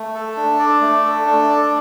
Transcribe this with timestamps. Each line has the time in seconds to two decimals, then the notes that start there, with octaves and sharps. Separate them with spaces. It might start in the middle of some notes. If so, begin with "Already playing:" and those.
Already playing: A3
0.14 A4
0.37 D4
0.59 D5
0.81 A3
1.05 A4
1.26 D4
1.49 D5